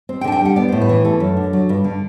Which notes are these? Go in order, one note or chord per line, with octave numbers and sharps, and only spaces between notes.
C4
G5
D3 A5
G5
G3 F#5
B3 D5
C5
A2
B4
E3
A3 A4
F#2
D3
F#3
G2
D3